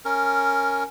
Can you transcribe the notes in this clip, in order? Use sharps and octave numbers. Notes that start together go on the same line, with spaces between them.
C#4 A#4